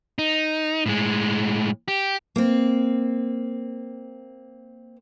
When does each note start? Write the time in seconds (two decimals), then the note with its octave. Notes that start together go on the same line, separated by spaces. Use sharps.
0.19 D#4
0.86 A2 G#3
1.88 G4
2.36 A#3 C4